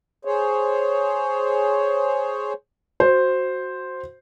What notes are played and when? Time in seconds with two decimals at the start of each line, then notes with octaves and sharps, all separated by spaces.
0.25 G#4 C5 C#5
3.00 F#4 C5